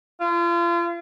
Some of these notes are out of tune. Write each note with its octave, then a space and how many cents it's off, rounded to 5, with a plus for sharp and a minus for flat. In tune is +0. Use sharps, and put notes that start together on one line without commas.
F4 -35